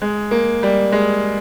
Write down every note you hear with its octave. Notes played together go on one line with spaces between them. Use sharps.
G#3
A#3
G3
G#3